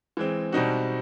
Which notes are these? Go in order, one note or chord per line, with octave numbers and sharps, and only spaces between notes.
E3 G#3 C4
B2 G3 C4 D#4 F#4